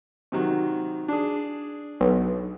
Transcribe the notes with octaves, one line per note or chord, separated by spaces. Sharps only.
C3 D#3 F#3
D4 G#4
B1